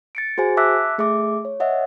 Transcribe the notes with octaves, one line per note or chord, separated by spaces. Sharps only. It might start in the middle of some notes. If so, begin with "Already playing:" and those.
A6 C#7 D7
F#4 G#4 C5 G#5
E5 A5 D6 E6 F#6 B6
A3 G#4 E5 D6
C#5
C#5 D#5 E5 F#5